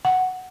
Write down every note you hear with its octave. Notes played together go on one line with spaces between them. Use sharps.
F#5